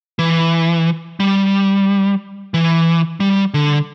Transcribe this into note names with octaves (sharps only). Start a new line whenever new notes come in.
E3
G3
E3
G3
D3